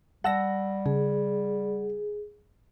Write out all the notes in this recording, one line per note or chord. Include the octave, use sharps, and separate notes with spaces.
G3 F#5 A5 E6 A#6
C#3 G#4